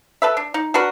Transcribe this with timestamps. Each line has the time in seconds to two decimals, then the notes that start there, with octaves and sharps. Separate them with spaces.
0.22 A4 B4 E5
0.37 D4
0.54 D#4
0.74 D4 F#4 A#4 B4